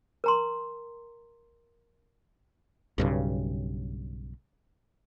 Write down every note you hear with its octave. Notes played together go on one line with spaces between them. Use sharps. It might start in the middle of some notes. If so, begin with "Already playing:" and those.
A#4 A#5 C6
B1 G2 C#3